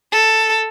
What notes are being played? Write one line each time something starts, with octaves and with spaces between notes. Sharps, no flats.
A4